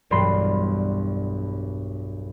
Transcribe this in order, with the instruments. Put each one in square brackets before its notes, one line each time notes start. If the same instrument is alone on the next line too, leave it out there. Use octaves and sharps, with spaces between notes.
[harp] E1 B1 G2 D4 B5 C6